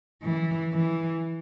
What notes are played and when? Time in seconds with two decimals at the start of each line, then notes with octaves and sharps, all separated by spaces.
0.23 E3
0.73 E3